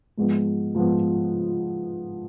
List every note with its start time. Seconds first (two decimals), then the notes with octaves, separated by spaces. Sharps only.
0.17 G#2 F3 G#3 B3
0.75 G#2 F3 G#3 B3